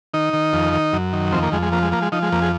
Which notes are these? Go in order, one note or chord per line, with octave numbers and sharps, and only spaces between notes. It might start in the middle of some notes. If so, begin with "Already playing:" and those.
D#3 D#4
D#3
F2
D#3
F#2
D#3
F2 C4
A#3
F2 G#3
G#3
F3 A#3
G#3
F3 A#3
G#3
F3 D#4
G#3
F2 A#3
G#4